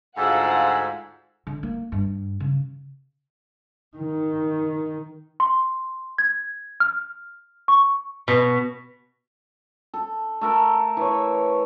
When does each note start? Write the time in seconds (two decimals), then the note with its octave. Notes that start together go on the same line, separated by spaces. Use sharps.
0.18 D2 G#2 F4 F5 F#5 G#5 E6
1.47 D3
1.63 A#3
1.92 G2
2.40 C#3
3.97 D#3
5.40 C6
6.18 G#6
6.80 F6
7.68 C#6
8.28 B2
9.94 A4
10.41 A3 A4 A#4
10.97 E3 C#5